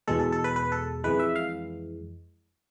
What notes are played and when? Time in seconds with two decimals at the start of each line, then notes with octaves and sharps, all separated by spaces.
0.08 E2 B2 G#3 A4
0.20 A4
0.32 A4
0.44 B4
0.56 B4
0.72 A4
1.04 F2 E3 G#3 B4
1.19 E5
1.36 F5